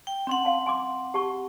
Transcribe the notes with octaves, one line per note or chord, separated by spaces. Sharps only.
G5
C4 C#4 F#5 C6
F5 A5
G#5 C6 D6
G4 A5 C#6